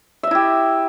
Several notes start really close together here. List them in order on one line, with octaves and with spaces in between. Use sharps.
E5 D#5 E4 G4